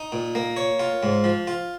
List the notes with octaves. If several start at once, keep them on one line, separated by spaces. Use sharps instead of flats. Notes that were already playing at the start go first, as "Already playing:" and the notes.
Already playing: D#4
A#2
A#3
C#5
F4
G#2
F3
F4